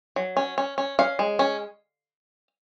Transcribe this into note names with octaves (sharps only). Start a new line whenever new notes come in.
F#3
C#4
C#4
C#4
C#4 F5
G#3
C#4